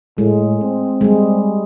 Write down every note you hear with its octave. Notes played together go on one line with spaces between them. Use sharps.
A2 G#3
C4
G3 G#3